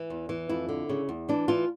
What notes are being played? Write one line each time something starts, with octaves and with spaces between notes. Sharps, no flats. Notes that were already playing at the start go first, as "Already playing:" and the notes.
Already playing: E3
E2
E3
F2 E4
D3
C#3
E2
E3 D4
E3 F4